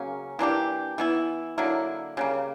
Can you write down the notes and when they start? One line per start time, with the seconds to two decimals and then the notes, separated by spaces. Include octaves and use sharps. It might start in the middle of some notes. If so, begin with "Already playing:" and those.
Already playing: C#3 F#3 A#3 C#4
0.39 E3 A#3 D4 G4
0.98 E3 B3 E4
1.58 D3 F#3 A#3 E4
2.17 C#3 G3 A#3